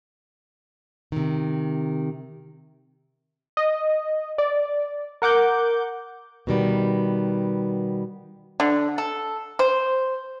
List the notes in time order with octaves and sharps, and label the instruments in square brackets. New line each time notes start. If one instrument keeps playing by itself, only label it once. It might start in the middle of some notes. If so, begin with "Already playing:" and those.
[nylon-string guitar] C3 D#3
[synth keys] D#5
D5
A#4 F#5 D6 G6
[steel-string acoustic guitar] B2 D#3 G3 B3
[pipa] D3
A4
C5